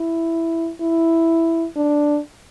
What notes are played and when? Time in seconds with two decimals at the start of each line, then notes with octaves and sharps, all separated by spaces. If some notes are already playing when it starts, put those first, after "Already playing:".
Already playing: E4
0.81 E4
1.76 D4